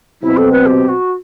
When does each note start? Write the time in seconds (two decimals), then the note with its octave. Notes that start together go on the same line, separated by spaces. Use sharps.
0.22 B2 F#3 C4 E4
0.37 A4
0.52 B4
0.66 G4
0.88 F#4